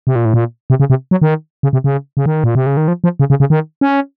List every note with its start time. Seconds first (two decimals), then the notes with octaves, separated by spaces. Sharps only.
0.07 C3
0.16 A#2
0.25 A2
0.34 A#2
0.70 C3
0.80 C#3
0.90 C3
1.11 F#3
1.22 D#3
1.63 C#3
1.73 C3
1.84 C#3
2.17 C#3
2.26 D#3
2.44 A#2
2.55 C3
2.66 C#3
2.77 D#3
2.88 F3
3.04 F3
3.20 C#3
3.30 C#3
3.40 C#3
3.50 D#3
3.81 C#4